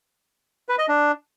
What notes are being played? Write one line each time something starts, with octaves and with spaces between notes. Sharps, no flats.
B4
D#5
D4